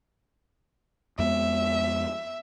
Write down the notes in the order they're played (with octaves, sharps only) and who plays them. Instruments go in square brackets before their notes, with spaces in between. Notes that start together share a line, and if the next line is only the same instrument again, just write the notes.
[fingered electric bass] F2 G#3 B3 [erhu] E5